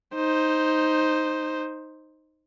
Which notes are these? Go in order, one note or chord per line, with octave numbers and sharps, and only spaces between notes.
D#4 C5